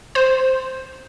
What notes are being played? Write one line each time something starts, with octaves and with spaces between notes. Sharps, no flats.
C5